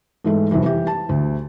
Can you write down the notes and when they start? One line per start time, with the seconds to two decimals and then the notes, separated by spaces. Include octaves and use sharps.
0.24 G#2 E3 G#3 A3
0.51 F2 C3 D#3 E3 G3
0.64 E3 G4
0.87 A5
1.09 D2